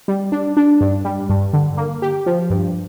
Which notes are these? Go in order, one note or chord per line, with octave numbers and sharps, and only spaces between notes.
G3
D4
D4
G2
G3
G2
D3
A#3
G4
F3
G2